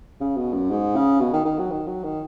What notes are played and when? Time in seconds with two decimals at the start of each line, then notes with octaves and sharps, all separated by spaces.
0.21 C#3
0.36 B2
0.54 F#2
0.70 G#2
0.96 C#3
1.20 B2
1.33 D#3
1.45 D#3
1.59 F#3
1.71 D#3
1.87 F#3
2.04 D#3